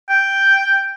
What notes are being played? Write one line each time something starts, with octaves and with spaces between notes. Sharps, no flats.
G5